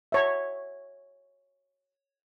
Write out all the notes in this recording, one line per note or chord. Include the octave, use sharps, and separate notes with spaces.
C#5 E5